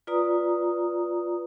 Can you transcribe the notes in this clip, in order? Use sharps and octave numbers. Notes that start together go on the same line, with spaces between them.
F4 B4 D5 A#5 D#6